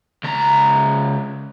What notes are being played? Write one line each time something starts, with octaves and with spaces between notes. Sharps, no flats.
C#2 A#5